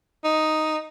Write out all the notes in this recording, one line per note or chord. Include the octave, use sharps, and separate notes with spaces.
D#4